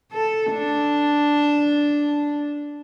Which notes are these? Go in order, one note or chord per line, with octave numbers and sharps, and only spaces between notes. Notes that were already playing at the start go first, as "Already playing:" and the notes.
A4
D4